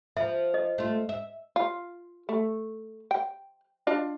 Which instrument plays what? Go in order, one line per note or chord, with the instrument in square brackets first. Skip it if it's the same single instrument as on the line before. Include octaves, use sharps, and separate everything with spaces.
[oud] F3 [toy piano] E5
[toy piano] D#5
[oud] A3 F4
E5
[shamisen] F4
A3
G5
D4 F4 D#5